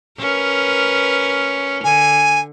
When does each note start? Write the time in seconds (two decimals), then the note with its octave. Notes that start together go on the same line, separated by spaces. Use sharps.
0.19 C#4 A#4 B4
1.84 D3 G#5